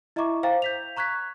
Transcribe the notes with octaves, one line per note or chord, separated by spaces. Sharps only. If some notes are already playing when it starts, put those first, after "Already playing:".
E4 D#5 E5 A#5 C#6 D6
C5 F5 G5 A#5 A6
G6 B6 F7
A#5 C#6 F#6 G#6 B6